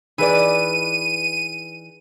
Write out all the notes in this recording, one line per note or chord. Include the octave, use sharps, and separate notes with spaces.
E3 D#4 G#4 B4 D5 D#7